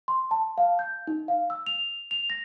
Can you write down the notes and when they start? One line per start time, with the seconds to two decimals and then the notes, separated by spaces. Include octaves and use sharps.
0.08 C6
0.31 A5
0.58 F5
0.79 G6
1.07 D#4
1.28 F5
1.50 E6
1.67 F7
2.11 F7
2.30 A#6